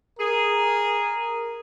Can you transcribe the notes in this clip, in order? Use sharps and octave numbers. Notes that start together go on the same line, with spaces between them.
G#4 A#4